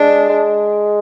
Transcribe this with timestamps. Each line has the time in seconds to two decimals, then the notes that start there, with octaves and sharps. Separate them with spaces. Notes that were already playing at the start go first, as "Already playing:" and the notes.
Already playing: G#3 D4
0.29 G#3